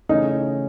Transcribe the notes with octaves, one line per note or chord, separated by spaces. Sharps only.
C#3 E3 A3 C#4 D#4